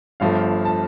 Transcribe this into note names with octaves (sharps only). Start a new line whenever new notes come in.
G1 G2 F3 A3 F5
A5